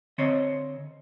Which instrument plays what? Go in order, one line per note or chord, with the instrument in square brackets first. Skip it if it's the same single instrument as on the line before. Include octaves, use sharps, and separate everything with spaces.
[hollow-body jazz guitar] D3 C4 C5 C#5 D#5